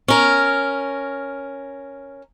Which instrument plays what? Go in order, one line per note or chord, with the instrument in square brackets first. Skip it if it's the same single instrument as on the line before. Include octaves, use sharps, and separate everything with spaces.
[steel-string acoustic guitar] C#4 A#4